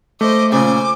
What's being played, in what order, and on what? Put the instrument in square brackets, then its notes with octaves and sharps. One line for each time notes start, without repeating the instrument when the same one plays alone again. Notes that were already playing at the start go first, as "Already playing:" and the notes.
[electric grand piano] A3 [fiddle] C5 D#5 [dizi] D6
[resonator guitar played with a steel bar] A#2 C#3 [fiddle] C5 G#5 [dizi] D6